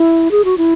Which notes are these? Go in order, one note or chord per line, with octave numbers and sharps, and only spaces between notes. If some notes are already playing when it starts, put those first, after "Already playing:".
Already playing: E4
G#4
F#4
E4